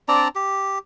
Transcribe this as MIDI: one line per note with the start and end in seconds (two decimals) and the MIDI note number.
0.08 0.28 60
0.08 0.28 62
0.08 0.28 74
0.08 0.28 82
0.35 0.79 67